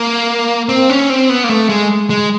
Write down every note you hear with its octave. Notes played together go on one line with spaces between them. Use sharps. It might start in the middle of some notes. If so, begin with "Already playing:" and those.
Already playing: A#3
C4
C#4
C4
B3
A#3
A3
G#3
G#3